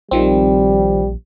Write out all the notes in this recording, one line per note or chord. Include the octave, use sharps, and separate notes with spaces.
A#1 D#3 F3 G3 C4